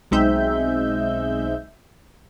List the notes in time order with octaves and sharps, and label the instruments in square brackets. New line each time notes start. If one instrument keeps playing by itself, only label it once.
[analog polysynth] B1 G#3 C4 D#4 E5 G6